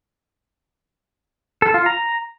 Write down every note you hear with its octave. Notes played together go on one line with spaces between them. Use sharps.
A4
F4
A#5